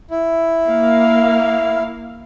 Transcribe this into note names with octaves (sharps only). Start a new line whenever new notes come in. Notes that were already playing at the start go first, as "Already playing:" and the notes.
E4
A#3 F5